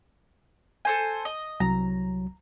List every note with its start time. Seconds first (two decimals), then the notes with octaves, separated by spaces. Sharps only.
0.85 A4 C5 G#5
1.25 D#5
1.60 C2 F#3 A#5